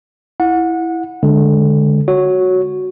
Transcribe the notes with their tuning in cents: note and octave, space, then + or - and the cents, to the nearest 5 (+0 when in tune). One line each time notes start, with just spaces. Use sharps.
E4 +0 F#5 -25
D3 +0 G#3 +0
F#4 -5 C#5 +0